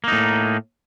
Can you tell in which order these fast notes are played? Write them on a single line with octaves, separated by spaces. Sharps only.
A#3 D#4 A2